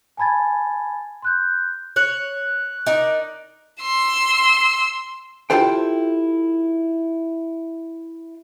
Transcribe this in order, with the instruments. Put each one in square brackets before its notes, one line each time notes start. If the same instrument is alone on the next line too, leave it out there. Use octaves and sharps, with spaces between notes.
[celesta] G#5 A5 B5 G#6 A6
C6 F#6 G6
[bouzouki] C#5 [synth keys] F#6
[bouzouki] D#4 A#4 D5
[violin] C6 E6
[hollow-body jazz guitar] E4 F4 G4 A4 C5 G5